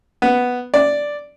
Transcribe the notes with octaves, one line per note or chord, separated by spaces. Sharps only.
B3
D5